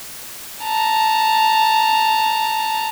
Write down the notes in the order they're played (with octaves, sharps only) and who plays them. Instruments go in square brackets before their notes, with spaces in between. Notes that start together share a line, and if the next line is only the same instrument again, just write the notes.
[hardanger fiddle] A5 A#5